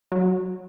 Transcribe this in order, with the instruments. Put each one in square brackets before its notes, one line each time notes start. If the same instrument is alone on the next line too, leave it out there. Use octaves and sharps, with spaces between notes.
[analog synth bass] F#3